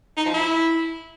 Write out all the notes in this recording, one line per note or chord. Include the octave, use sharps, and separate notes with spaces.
D#4
F3
E4